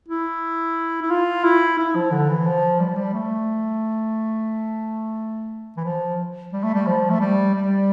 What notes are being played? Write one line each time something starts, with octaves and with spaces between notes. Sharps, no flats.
E4
E4
F4
E4
E4
F3
D3
E3
F3
G3
F3
G3
A3
E3
F3
G3
A3
G3
F3
A3
G3
G3